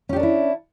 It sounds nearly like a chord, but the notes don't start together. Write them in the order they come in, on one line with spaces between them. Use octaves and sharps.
C#4 G4 D4 A#4 E4